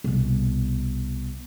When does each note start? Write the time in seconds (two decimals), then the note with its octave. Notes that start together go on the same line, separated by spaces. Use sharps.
0.04 C2 B2